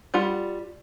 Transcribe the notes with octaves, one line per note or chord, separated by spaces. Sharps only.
G3 F4 F#5 B5